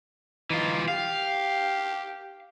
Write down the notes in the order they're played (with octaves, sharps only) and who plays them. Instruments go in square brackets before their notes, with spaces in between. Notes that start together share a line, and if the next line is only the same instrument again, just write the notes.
[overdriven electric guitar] E3 F4 [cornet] D#4
[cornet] G4 [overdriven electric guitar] F5